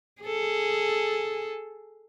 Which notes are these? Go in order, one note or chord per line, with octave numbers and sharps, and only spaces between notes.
G#4 A4